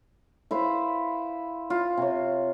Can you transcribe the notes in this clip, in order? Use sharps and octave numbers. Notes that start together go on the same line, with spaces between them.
E4 B4 C5 F5
F4
C3 C#5